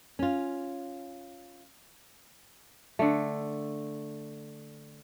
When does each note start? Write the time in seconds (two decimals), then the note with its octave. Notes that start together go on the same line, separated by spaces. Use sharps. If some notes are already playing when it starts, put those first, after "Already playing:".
0.19 C#4 F4
2.99 D3 A3